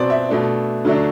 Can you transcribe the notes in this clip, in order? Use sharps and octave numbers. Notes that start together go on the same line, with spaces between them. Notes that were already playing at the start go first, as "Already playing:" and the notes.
Already playing: B2 F#3 C4 C5 D5
E5
B2 A3 D4
D3 F#3 A3 D4